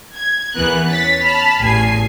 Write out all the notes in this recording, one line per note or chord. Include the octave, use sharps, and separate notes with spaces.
G#6
E2 E3 B3 A#4 F#6
C#4 A6 B6
A5 B5 F6
A1 E2 G#5 C7